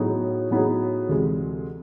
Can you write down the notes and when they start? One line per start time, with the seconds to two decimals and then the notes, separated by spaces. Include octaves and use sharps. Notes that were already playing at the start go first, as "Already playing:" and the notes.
Already playing: A2 F#3 B3 D#4 G#4
0.51 A2 F#3 B3 D#4 G#4
1.09 D2 C3 E3 G#3